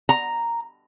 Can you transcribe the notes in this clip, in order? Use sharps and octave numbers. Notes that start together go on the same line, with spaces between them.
A#5